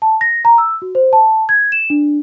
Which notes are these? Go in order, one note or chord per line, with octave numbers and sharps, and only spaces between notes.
A5
A#6
A#5
E6
F#4
C5
A5
G#6
E7
D4